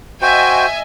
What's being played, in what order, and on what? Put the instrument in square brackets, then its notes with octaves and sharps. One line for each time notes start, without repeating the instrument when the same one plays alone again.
[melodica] F#4 C5 G5 [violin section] D#5 E5 G#5